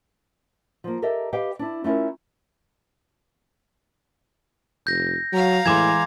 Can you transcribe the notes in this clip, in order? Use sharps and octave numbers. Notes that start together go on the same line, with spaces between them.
F3 A#3
G4 A4 A#4 D#5 E5
G4 B4 D#5 F5 G5
D4 E4
A3 C#4 E4 F4 A#4
F1 G6 A#6
F#3 F5 A#5
A2 E3 G#3 C6 D6 G#6 E7